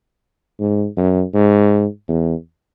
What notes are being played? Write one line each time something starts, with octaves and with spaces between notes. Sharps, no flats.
G#2
F#2
G#2
E2